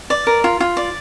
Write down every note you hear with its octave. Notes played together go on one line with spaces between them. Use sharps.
D5
A#4
F4
F4
D5